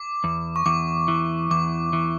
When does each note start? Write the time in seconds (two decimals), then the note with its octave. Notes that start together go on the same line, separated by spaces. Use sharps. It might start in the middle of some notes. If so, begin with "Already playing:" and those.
Already playing: D6
0.24 E2
0.56 C#6
0.66 E2 D6
1.08 E3
1.51 E2 D6
1.93 E3